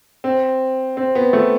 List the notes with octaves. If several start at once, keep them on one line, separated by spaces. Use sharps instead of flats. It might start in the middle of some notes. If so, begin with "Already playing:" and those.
C4
C4
B3
A3